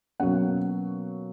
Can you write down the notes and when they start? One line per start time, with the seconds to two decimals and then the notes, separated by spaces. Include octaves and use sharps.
0.20 B2 F#3 A#3 C#4 F#5